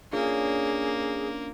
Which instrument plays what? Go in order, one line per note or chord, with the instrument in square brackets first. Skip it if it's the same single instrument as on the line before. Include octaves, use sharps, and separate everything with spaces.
[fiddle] A#3 [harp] C#4 D4 F4 [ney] G#4